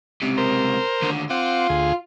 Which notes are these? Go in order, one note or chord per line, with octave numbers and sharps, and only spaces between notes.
C#2 C3
A#4 C5
D#2 D3
C4 F4 F#5 D6
D2 G#4